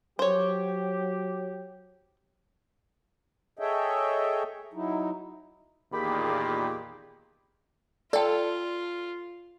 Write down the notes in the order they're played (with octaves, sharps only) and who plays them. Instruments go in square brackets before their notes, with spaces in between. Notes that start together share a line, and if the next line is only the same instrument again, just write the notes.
[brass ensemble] F#3 G4 [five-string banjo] C5 C#5
[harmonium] G#4 A4 C#5 D#5 E5 G5
F#3 D#4 E4
[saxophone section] E2 G4 [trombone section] A#2 D#3 [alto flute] G#4 [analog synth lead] B5
[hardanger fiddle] F4 [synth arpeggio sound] A4 [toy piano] D5 G5